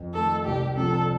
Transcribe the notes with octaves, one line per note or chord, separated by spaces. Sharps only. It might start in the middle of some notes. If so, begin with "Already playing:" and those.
Already playing: F2
D#3 A3 D#4 A4
C2 G4
C3 F3 A4